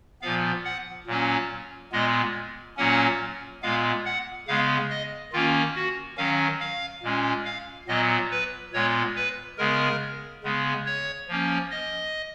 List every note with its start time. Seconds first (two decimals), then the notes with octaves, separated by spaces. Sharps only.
0.22 A#2 F3 B3 F5
0.64 F#5
1.07 A#2 F#3 A#3 C#4
1.92 A#2 G#3 B3 D#5
2.77 A#2 F#3 A#3 C#4 F#5
3.63 A#2 G#3 B3 F5
4.05 F#5
4.48 C#3 G#3 B3 F5
4.90 D#5
5.33 D#3 A#3 C#4 F4
5.75 F#4
6.17 D#3 F#3 C#4 F5
6.61 F5
7.03 A#2 G#3 C#4
7.45 F5
7.88 A#2 F#3 B3 D#5
8.31 B4
8.73 A#2 G#3 B3 C#5
9.16 B4
9.58 C#3 G#3 B3 A#4
10.43 C#3 G#3 B3
10.86 C#5
11.28 F3 A#3 C#4
11.71 D#5